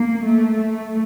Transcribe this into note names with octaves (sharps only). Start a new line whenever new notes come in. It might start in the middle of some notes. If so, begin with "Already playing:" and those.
Already playing: A#3
A3
A3